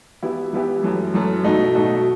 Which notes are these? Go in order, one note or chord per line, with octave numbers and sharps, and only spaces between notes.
E3 B3 E4 G4
E3 B3 E4 G4
F#2 E3 A3
F#2 E3 A3
B2 A3 D#4 F#4
B2 A3 D#4 F#4